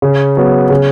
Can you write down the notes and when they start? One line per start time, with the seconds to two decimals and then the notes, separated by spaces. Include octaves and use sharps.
0.02 C#3
0.37 F#3 B3
0.70 C#3